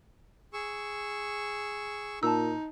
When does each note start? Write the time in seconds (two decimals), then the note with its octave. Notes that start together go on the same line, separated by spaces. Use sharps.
0.53 G#4 C#6 E6
2.23 A#2 D#4 A5 E6